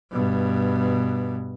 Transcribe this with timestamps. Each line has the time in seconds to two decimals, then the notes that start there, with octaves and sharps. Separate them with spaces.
0.12 G2 B2